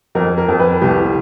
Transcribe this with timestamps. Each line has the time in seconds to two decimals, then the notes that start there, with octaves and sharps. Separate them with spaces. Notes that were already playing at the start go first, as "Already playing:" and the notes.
0.15 F2 A#4
0.38 A#4
0.49 F2
0.59 B4
0.82 C2 G4